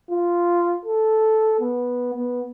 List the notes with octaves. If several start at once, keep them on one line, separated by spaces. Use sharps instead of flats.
F4
A4
B3
B3